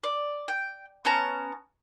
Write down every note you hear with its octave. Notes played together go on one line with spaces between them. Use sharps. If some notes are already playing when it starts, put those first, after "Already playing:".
D5
G5
B3 C#4 A5 A#5